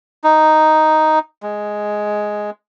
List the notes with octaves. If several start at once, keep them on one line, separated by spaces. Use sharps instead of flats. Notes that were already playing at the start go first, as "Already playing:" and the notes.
D#4
G#3